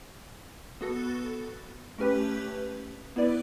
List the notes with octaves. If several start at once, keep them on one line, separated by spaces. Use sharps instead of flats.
B3 F#4 A4
A3 C#4 G4 B4
B3 E4 B4 D5